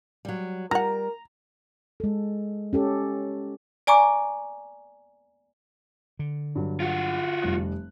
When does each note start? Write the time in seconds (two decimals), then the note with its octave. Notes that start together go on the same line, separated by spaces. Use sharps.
0.25 F#3 G3
0.71 G3 F4 A#4 F#5 A#5
2.00 G#3 A4
2.73 C#4 G4 A4
3.87 D5 G#5 A#5 C#6 D6
6.19 D3
6.55 G2 F#3
6.80 F4 F#4
7.42 F1 G3 F#6